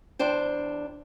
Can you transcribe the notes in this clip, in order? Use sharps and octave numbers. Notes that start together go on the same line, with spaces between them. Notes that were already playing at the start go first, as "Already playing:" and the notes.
E2 D4 C5 G5